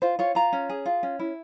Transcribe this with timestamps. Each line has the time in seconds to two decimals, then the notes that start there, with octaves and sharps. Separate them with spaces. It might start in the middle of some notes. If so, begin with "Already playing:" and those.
0.02 F4 C5
0.19 F4 C#5
0.35 F4 A#5
0.53 C#4
0.70 G#4
0.86 F4
1.03 C#4
1.19 E4